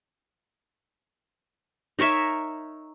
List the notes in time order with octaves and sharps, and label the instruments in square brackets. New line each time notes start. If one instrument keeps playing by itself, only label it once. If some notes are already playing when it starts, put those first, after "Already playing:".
[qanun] D#4 A#4 C#5 E5